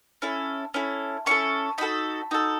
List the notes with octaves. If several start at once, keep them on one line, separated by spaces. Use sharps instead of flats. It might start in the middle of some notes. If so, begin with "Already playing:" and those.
C#4 E4 A4
C#4 E4 A4
C#4 E4 A4 C#6
D#4 F#4 A4 B5
D#4 F#4 A4